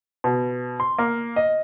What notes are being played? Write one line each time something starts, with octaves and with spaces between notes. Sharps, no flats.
B2
C6
A#3
D#5